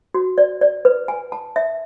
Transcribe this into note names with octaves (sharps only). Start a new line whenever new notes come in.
F#4
D5
D5
B4
G#5
A5
E5